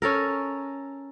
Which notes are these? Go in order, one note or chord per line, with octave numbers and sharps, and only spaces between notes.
C#4 A4 A#4